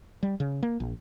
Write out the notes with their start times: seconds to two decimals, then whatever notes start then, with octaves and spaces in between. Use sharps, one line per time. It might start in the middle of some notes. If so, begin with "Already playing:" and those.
0.23 G3
0.40 C#3
0.63 A#3
0.80 A#1